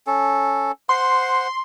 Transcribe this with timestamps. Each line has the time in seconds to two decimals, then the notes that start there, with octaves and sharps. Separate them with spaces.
0.07 C#4 A4
0.89 C5 F#5 C6